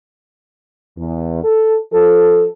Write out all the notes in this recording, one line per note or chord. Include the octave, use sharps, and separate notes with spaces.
E2
A4
F3 A4